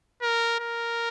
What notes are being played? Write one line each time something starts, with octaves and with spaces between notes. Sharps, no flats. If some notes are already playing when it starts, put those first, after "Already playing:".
A#4
A#4